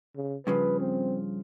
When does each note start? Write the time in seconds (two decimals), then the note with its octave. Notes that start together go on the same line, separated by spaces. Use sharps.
0.16 C#3
0.47 G2 C#3 F3 B4
0.80 C4